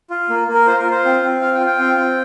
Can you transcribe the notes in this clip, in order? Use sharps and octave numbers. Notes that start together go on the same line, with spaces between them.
F4
A#3
A#3
A#4
F4 C5
A#4
F4
C5
C4
C4
F4 F5
G5
F4
G5
C4
C4